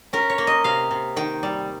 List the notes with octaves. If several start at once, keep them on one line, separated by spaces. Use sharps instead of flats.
C#4 A#4
C#5
A#3
D#5
C3 F5
C3
D#3 G5
G3